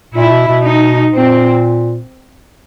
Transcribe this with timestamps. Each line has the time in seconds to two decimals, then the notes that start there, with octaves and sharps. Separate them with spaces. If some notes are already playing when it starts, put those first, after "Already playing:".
0.14 A#2 E4
0.31 B2
0.48 B2
0.64 D#4
1.12 A#2 C4